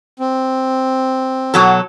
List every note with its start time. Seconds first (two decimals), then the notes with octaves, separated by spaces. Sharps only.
0.19 C4
1.54 B2 F#3 A4